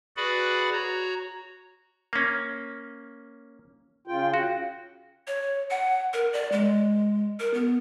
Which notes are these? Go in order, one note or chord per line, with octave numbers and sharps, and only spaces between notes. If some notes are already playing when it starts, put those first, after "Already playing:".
F#4 G#4 B4 D5 F#5 B5
F#4 C#5 A#5
A#3 C#4
C#3 F4 G5
F#4
C#5
F#5
A#4
D5
G#3
A#4
B3